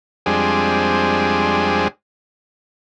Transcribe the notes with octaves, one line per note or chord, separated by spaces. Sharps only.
F2 G3 G#3 C4 D4 G#4